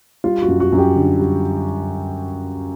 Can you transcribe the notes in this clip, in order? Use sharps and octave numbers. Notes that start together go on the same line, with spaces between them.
G3 F4
F#4
F#2
F#4
F#2
G4
D3
G3